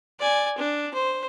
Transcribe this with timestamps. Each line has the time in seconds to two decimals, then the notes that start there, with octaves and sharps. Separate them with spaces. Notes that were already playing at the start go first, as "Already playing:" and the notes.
0.19 D5 G#5
0.58 D4
0.94 C5